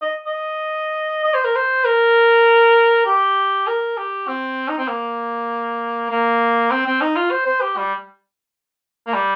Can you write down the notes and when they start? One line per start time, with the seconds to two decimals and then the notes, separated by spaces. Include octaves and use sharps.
0.02 D#5
0.26 D#5
1.24 D#5
1.34 C5
1.44 A#4
1.55 C5
1.85 A#4
3.06 G4
3.67 A#4
3.97 G4
4.27 C4
4.68 D#4
4.78 C4
4.88 A#3
6.10 A#3
6.71 C4
6.86 C4
7.01 D#4
7.16 F4
7.31 C5
7.46 C5
7.61 G4
7.77 G3
9.07 A#3
9.13 G3